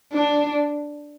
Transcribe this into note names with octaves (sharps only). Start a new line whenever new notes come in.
D4